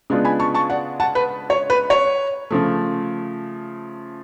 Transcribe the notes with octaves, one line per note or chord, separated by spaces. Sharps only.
C#3 G#3 B3 D4 F4
G#5 B5
A5 C#6
A5 C#6
D5 F#5
F#5 A5
B4
C#5
B4
C#5
C#3 F3 A3